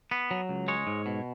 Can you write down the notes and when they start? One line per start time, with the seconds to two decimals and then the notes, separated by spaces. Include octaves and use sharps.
0.11 B3
0.31 F#3
0.49 C#2
0.68 G#3 C#5
0.87 G#2
1.06 B2